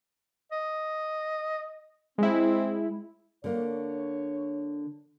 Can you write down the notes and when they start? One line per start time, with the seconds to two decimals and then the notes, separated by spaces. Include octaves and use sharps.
0.52 D#5
2.18 G#3 C4 E4
3.44 D3 A#3 C#5